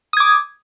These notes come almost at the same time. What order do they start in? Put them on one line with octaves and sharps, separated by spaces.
D#6 G#6 D6